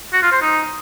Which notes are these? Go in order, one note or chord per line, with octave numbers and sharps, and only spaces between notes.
F#4
F4
C5
D#4